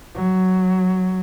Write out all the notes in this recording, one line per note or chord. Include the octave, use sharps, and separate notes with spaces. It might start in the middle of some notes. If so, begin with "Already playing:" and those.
F#3